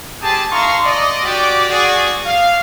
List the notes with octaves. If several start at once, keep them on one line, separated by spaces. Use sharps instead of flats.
C4 G4 G#4 A5
A3 D#4 F5 A#5 C6 C#6
D5 D#5
F#4 G4 D5
F#4 G#4 D5
F5